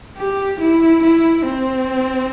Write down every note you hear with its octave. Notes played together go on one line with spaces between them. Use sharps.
G4
E4
E4
C4